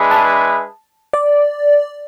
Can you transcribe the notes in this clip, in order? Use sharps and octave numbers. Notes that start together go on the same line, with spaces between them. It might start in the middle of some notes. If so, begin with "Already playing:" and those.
Already playing: G#3 D4 G#4 B4 E5
A5
D5